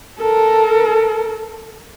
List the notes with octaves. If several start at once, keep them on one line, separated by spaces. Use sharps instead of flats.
A4 A#4